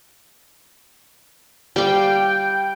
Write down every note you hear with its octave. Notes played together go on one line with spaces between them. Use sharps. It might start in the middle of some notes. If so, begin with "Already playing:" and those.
G3 F5 G5